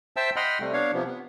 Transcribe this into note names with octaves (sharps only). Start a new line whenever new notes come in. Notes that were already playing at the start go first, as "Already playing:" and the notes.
C5 E5 G5 A5 E6
D#5 F#5 G5 B5 C6 F6
C3 G3 A3
B3 D4 C#5 F5
C3 F3 B3
B3